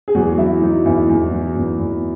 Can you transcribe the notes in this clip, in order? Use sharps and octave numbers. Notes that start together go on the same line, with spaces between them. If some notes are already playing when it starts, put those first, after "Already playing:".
G#4
E2 F#3 F#4
F#3 E4
F#3 D#4
E2 E4
E2
F#3
E2
E2